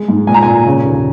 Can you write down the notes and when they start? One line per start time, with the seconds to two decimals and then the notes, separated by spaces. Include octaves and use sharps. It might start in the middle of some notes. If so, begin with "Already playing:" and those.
Already playing: G#3
0.08 G#2
0.27 A#2 G#5
0.34 A#5
0.43 A#2 G#5
0.67 C#3
0.85 D#2